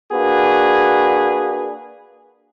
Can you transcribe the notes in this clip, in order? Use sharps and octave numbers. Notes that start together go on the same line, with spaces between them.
A#3 D4 F#4 G#4 B4